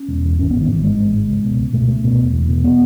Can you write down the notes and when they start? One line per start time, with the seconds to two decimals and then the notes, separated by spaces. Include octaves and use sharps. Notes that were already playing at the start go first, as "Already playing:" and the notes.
Already playing: C#4
0.08 E1
0.24 E2
0.38 G#1 C#4
0.51 G#2 B3
0.61 D#3
0.68 G#1 E3
0.83 G#2 G#3
0.99 G#1
1.14 G#2
1.28 C#2
1.44 B2
1.58 C#2
1.73 B2 A3
1.89 C#2
2.04 B2
2.19 E1
2.33 E2
2.49 B2
2.64 B3